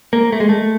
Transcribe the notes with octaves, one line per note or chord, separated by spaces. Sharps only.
A#3
A3
G#3
A3